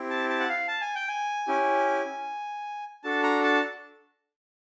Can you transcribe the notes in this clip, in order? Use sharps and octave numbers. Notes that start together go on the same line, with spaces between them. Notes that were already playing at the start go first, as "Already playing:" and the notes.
Already playing: C4 E4 G4
A5
A5
F#5
F5
A5
G#5
G5
G#5
C#4 E4 G4
D4 F#4 A4 A5
A#5
A5